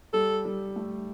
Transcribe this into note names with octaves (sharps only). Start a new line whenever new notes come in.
G3 A4
G3
A3